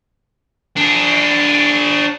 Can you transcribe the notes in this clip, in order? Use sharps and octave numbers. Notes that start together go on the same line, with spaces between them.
D4 G#4